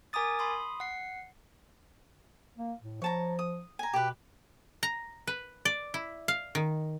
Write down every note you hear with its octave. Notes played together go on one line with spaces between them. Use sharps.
A#4 G#5 A#5 D6 D#6 A6
B5 C6 D#6
F#5 C7
A#3
A2
F3 C#5 A5 A#5
D#6
G#5 A#5
B2 G4 B4
A#5
B4
D5
E4
F5
D#3